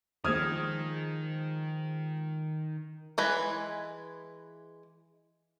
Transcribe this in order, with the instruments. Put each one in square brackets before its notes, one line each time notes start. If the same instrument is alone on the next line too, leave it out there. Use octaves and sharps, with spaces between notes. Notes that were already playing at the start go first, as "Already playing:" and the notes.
[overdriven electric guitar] D#3 [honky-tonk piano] F3 G#3 [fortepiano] D#6 [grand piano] F6 G#6
[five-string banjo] E3 G#3 B4